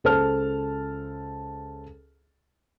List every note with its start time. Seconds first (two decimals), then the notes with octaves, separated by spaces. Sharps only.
0.04 C#2 A4 C5 A5 F6